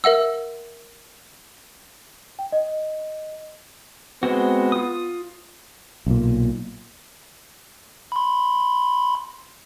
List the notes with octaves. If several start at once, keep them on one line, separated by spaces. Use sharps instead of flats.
A#4 E5 F#5 E6
G5
D#5
G#3 B3 C4 F#4
F4 D#6
B1 A#2
B5 C6